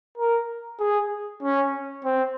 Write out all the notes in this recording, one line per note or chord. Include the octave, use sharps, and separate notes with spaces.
A#4
G#4
C#4
C4